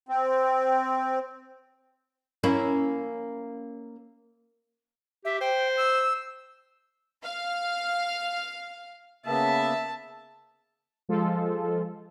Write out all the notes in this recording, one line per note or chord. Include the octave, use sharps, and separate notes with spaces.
C4
A#3 C#4 E4
G4 E5
C5 G5
E6
F5
C#3 A#3 B3 E5 A5
F3 G#3 F4 A4